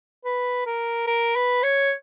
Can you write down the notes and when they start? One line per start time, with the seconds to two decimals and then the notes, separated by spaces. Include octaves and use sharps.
0.25 B4
0.66 A#4
1.07 A#4
1.35 B4
1.63 C#5